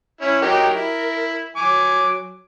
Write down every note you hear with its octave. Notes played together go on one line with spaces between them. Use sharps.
C#4 E4
F#3 D#4 G4 A#4
E4
F#3 G#5 D6